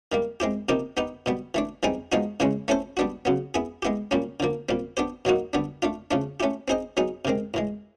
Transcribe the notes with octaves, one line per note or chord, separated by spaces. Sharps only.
D#3 G3 A#3
G#3 C4 E4 G4
C3 F3 A#3 D#4 G4
B3 D#4 G4 B4
B2 G3 B3
E3 A3 D4
E3 G3 C4 D#4 G#4
F3 G#3 B3 D#4 F#4
C#3 E3 G#3 C#4 E4
A3 C#4 E4 A4 C5
G3 B3 D4 F#4
C#3 F#3 B3
B3 E4 G#4
G#3 B3 E4 G4
A#2 G3 A#3 C#4
D3 F3 A#3
A#2 G3 C4
B3 D4 G4 C5
B2 F#3 A#3 D#4 F#4
D3 G3 B3 D4
A3 D4 F4
C#3 F3 A3 D4
A3 C#4 E4 G4
C4 D#4 G#4 C5 D#5
F#3 B3 D#4 G#4
C3 D#3 G#3 C4
A2 E3 G#3